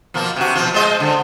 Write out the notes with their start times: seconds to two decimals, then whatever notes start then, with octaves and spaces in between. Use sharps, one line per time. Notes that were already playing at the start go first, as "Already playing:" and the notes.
0.14 B2 F3 A#3
0.36 C3 F#4
0.55 B2 F3
0.74 G#3 C5 D#5
1.00 D3